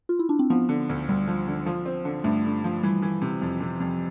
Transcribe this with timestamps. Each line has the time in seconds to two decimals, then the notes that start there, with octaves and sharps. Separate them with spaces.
0.09 F4
0.19 E4
0.29 D4
0.39 C4
0.50 F3 B3
0.69 D3
0.89 D2
1.09 D2 G3
1.28 F3
1.47 D3
1.66 F3
1.85 C4
2.05 D3
2.24 G2 A3
2.45 D3
2.64 F3
2.83 E3 G3
3.02 E3
3.22 C3
3.42 F2
3.60 C3
3.80 F2